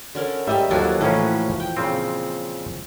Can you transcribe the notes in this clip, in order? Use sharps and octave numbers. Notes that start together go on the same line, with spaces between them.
D3 C#4 A#4
G3 G4 D#5 E5
D#2 F3 F#3 F#4 A4 D5 G#5
A2 E3 A#3 C#4 B4 D#5
G5
A#2 C#3 C4